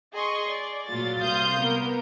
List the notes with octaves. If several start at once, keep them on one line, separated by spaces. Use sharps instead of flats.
G#4 D#5 C6 C#6
D5
A#2 F#3 F4 A6
C2 F5 C6 D#6 G6
A#3 B3 A#4